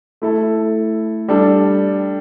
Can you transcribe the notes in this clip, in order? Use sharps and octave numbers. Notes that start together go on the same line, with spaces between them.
A3 E4 A4
G3 D4 A4